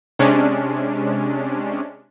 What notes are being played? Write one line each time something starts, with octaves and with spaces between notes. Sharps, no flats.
C3 G#3 C#4 D4